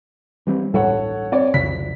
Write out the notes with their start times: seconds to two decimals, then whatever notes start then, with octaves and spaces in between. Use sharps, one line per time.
0.47 E3 G3 C4
0.74 D1 A1 G2 A4 C#5 F#5
1.32 C4 C#5 D5
1.54 C2 F2 C#3 B6